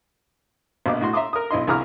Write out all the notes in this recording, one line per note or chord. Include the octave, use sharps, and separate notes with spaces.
A#1 B2 D6
A2 F#4 C6
E5 A#5 C6 D6 D#6
A#4 D#6
B1 E4 D#5 C6
C2 E4 G#4 A#5 D6 F6